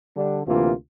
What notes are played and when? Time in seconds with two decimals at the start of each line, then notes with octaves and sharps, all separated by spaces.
0.13 D3 G3 D4
0.45 D2 C3 E3 A#3 F4